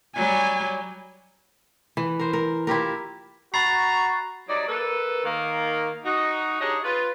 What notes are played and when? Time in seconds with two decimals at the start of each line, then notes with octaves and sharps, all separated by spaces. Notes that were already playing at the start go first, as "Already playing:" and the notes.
0.16 F#3 G3 G#5
1.97 E3
2.19 A#4 C5
2.33 A#4
2.67 E4 F4 G4 A#4
3.54 F#4 A#5 B5 C#6 A6 C7
4.48 F#3 G3 D#4 D5
4.68 A#3 A4 B4
5.24 D#3 A#3
6.05 D#4 F#4
6.61 D4 D#4 G4 G#4 C#5 D#5
6.84 F4 B4